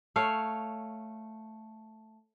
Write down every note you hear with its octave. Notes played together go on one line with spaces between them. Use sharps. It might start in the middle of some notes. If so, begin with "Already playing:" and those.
A3 C#5 F5